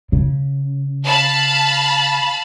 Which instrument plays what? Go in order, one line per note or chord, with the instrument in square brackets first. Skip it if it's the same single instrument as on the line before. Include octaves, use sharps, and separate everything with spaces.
[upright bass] C#3
[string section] F5 A5 B5